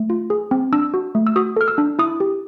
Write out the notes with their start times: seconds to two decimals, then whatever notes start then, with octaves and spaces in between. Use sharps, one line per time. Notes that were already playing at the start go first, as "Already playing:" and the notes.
Already playing: A3
0.10 F4
0.30 G#4
0.51 C4
0.73 D4 E6
0.94 F#4
1.15 A3
1.27 E6
1.36 F#4 D#6
1.57 A4 F6
1.68 E6
1.78 D4
1.99 E4 D#6
2.20 G4